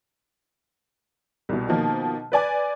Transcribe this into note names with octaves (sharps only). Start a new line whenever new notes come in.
C2 B2
B2 D#3 F3 A#3
B4 D5 G#5 D6